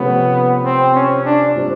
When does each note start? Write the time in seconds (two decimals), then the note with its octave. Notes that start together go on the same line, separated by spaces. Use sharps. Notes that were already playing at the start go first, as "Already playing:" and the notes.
Already playing: C3 F3 A3 B3 C#4
0.64 C4
0.95 C#4
1.25 D4
1.55 A#2 G3 C4